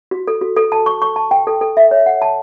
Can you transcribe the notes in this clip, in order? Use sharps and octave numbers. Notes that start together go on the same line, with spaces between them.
F#4
A4
F#4
A4
A5
C#6
C#6
A5
G5
A4
A4
E5
C#5
F#5
A5